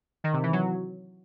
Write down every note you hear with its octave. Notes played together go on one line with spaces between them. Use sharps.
D#3
C3
E3
F#3